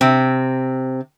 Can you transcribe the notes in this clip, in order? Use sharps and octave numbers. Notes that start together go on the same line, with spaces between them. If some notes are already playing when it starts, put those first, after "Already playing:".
C3 C4